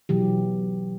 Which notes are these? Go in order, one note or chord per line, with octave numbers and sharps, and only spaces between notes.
B2 E3 F#3 G4